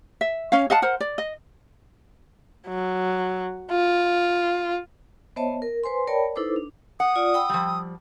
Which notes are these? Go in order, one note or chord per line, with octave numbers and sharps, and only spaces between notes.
E5
C#4 C#5 F5
D#5 F5 F#5 A5
A#4 C5 F#5
D5
D#5
F#3
F4
B3 C5 C#5 D#5 E5 A5
A#4
B4 C5 G#5 C6
A#4 C#5 D5 G5 A5 B5
D#4 E4 A4 B4 C5 D6
D4
F#5 D#6
F4 D5
G5 B5 E6
F3 G3